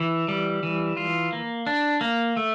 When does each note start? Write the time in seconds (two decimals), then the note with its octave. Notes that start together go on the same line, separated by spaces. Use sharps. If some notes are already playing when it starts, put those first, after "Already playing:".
Already playing: E3
0.28 G3
0.63 E3
0.97 F4
1.33 A#3
1.67 D4
2.01 A#3
2.37 A3